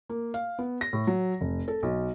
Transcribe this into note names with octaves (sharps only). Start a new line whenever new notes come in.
A#3
F5
B3
A#6
A2
F#3
F1
A4
B1